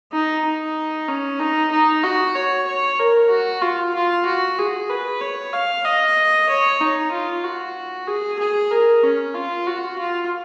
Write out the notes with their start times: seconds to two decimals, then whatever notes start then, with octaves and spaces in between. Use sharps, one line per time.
0.12 D#4
0.45 D#4
1.08 C#4
1.40 D#4
1.71 D#4
2.03 F#4
2.36 C#5
2.67 C#5
2.99 A#4
3.30 F#4
3.62 F4
3.95 F4
4.26 F#4
4.58 G#4
4.90 B4
5.21 C#5
5.53 F5
5.85 D#5
6.49 C#5
6.81 D#4
7.12 F4
7.44 F#4
8.07 G#4
8.39 G#4
8.71 A#4
9.03 C#4
9.34 F4
9.67 F#4
9.99 F4